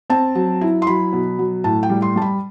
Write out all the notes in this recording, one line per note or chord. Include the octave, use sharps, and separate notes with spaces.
C4 A5
F#3
E4
C6
F#3 B5
B2
F#3
A2 A5
G5
G3
C6
G3 A5
B5